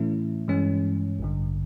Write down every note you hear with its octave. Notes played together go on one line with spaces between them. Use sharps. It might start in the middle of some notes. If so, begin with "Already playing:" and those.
Already playing: A2 E3 A3 C#4 E4
G2 E3 G#3 C#4
A1 G2 D3